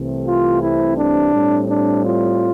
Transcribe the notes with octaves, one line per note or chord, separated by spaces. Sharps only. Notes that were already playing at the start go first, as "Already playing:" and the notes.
Already playing: C2 C3 E3 A3 C4
F4
E4
D4
A2 G3 C4
D4
F4